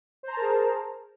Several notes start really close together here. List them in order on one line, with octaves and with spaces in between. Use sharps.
C5 A#5 A5 A#4 G#4